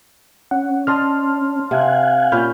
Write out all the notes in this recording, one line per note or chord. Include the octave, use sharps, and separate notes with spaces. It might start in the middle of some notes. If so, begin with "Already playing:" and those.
C#4 F#5
D4 D#5 A5 C6 F6
C3 F5 F#5 G#5
A#2 C#4 B5 F6 G6